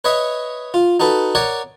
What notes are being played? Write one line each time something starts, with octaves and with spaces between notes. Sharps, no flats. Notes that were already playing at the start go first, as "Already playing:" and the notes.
B4 C#5 D#5 E5
F4
D#4 F#4 A4 B4
A#4 C#5 D5 F#5 G#5